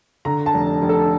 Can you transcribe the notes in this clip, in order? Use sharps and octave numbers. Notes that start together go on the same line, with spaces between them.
D3 A#5
A5
F1
F1
A4